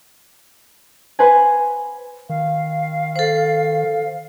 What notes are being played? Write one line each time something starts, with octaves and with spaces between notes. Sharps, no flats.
B4 C5 F#5 G#5
D#3 F5
A4 C5